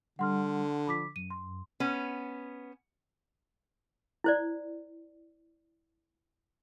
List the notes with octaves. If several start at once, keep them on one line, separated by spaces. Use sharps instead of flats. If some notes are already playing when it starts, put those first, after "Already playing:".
D3 G3 F#5 C6 F6
F3 B5 D6 B6
F#2 D#7
C6
B3 C#4
E4 C5 D5